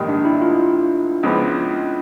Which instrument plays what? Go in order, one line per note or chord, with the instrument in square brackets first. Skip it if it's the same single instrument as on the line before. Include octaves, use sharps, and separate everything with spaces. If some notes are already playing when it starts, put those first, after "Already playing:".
Already playing: [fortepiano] A#1 G#2 D#3 G3 A#3
[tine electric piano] D4
E4
F4
[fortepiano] C#2 C#3 F3 G#3 B3